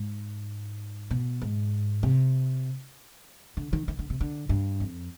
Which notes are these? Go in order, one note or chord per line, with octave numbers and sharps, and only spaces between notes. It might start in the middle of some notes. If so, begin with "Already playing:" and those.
Already playing: G#2
B2
G#2
C3
D3
D#3
D#3
D3
C3
D3
G2
F2